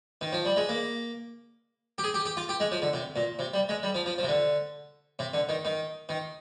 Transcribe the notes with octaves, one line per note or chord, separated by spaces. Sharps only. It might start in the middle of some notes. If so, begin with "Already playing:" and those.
D#3
F3
G3
G#3
A#3
G4
G#4
G4
G4
F4
G4
G#3
F3
D3
C3
A#2
C3
G3
G#3
G3
F3
F3
F3
C3
D3
C3
D3
D#3
D#3
D#3